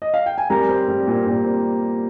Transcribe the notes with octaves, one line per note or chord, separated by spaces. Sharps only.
D#5
F5
G5
G#5
G3 A#4 A#5
C4
G3
A#2
A#2
C4